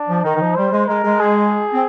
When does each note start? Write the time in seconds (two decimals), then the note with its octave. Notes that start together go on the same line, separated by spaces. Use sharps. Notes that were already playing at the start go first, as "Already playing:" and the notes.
Already playing: D4
0.08 F3
0.24 D#3 D#4
0.35 D#3
0.40 F3
0.56 G3 C5
0.72 G#3
0.87 G#3 A#4
1.04 G#3
1.20 G#4
1.73 C4